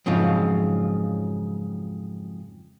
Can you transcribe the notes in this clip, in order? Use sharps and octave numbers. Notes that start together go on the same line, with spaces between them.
F2 G#2 C#3 F3 F#3